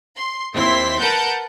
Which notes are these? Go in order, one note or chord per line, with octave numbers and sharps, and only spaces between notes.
C6
D#2 C4 E4 C6 B6
A#4 B4 F#5 A5 G6